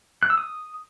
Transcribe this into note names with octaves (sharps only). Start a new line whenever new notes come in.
F#6
E6
D#6